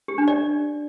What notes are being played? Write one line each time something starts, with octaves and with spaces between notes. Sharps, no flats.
G4
D4
D5